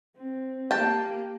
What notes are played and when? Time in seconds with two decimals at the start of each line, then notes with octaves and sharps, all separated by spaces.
0.16 C4
0.71 A#3 G4 G5 A5